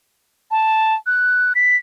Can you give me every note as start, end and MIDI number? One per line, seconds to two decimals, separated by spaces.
0.51 0.94 81
1.06 1.53 90
1.55 1.76 95